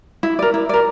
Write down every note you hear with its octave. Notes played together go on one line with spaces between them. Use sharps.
E4
A#4 D5
E4
A#4 D5